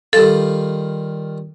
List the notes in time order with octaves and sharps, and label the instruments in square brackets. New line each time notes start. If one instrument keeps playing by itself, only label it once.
[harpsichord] D#3 G3 F4 [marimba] A4